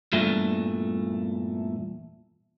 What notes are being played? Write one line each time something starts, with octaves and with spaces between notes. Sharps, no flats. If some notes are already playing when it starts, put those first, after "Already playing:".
E2 G2 A#2 A3